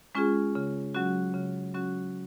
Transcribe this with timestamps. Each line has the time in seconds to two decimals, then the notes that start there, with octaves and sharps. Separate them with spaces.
0.15 G#3 C#4 F4 G#4
0.55 C#3
0.94 F#3 C#4 F#4
1.34 C#3
1.74 F#3 C#4 F#4